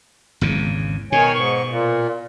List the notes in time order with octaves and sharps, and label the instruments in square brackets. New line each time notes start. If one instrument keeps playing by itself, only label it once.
[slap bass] G#1 E2 C#3
[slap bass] B2 [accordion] D#3 C#5 G#5
[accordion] G#2 C#6
A#2